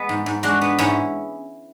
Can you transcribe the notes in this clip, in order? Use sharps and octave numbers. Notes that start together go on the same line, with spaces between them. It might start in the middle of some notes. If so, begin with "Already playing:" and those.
Already playing: G#3 B3
G#2
G#2
G#3 D4 F#4
B3
G#2 C#4 E4